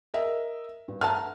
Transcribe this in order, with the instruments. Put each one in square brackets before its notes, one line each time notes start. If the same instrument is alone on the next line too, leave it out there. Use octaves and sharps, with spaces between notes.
[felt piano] A#4 D#5 E5
G2
[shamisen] A3 F#5 A5 [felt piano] A#5 F6